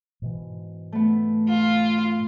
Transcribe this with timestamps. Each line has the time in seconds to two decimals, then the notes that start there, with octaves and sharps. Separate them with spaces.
0.22 G#2 B2 E3
0.92 A3 B3
1.49 F4